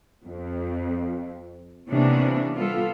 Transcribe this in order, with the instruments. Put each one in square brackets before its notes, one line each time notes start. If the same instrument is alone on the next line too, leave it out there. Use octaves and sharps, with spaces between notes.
[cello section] F2
C3 E3 A#3 B3 C#4 D4
G3 B3 F4 A4